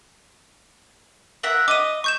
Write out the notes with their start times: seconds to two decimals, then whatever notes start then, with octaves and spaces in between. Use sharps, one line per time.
1.43 A#4 E5 F#5
1.68 D#5 D6 D#7
2.04 C#6 G6 E7